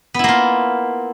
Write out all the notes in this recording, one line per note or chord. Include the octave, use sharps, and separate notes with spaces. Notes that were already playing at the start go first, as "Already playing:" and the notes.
A#3 B3 E4 F4